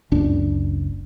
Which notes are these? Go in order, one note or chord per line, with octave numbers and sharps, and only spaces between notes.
F#1 C#2 D4